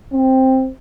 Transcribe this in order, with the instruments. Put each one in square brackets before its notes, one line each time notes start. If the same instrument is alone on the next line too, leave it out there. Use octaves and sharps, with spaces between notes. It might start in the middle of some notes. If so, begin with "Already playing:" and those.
[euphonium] C4